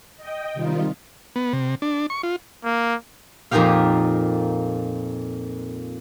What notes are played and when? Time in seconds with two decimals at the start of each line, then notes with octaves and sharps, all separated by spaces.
0.17 D#5 G5
0.53 C3 D#3 G3 D#4 F4
1.36 B3
1.53 C3
1.82 D4
2.10 C#6
2.23 F4
2.65 A#3
3.51 F2 A#2 A#3 D#4 G4 F5